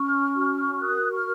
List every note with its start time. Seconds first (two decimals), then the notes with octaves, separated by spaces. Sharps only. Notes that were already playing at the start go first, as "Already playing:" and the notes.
Already playing: C#4 C#6 F6
0.34 F#4
0.81 A#4 D#6 F#6
1.12 C#6 F6